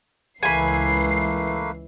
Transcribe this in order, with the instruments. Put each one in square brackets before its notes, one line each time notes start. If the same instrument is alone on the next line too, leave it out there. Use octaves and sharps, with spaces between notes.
[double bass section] C#2 E3 [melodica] A3 A#3 B4 [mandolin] G#5 B5 [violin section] C7